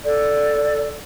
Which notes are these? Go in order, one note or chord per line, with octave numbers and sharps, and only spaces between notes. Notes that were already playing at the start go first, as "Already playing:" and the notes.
A4 D5